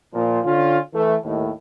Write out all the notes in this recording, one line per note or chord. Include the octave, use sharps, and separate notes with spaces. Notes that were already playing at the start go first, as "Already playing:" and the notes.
A#2 F3
D3 C#4 F4
E3 A3
D#2 A2